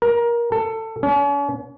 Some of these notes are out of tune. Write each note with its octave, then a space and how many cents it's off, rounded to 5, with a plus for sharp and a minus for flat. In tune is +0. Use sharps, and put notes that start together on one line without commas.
A#4 +20
A4 +20
C#4 +40